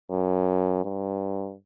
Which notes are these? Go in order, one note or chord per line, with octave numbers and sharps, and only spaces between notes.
F#2
G2